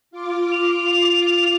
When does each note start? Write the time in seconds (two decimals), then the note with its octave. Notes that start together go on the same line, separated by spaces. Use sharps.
0.11 F4 D6
0.52 F7